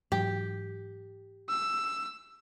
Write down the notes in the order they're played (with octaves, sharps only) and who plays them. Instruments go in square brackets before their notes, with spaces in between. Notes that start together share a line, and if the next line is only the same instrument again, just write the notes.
[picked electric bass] G#2 E3 F#3 [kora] G4
[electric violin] E6